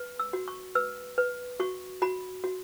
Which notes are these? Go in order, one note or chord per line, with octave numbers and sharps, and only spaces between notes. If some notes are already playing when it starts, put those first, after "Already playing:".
Already playing: B4
E6
F#4
C#6
B4 E6
B4
F#4 C#6
F#4 B5
F#4